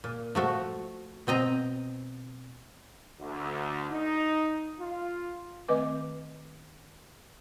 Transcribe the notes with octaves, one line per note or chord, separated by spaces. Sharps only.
A#2
F3 A3 F#4
B2 C4 D#5 A#5
D2
D#4
F4
D#3 A3 C4 B4 D#5 D6